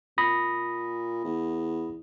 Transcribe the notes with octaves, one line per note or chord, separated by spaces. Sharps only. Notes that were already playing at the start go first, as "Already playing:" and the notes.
A#2 B5 D#6 A#6
E2